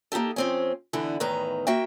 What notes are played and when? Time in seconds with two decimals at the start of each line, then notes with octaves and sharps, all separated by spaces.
0.12 A#3 D#4 F4 G4 A4
0.36 F2 C4 C#4
0.93 D3 E3 B3 E4
1.20 E2 A2 D#3 B4 A#5
1.67 A#3 F#4 E5 G5